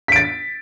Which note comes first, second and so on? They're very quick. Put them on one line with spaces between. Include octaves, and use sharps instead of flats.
B6 D7 A6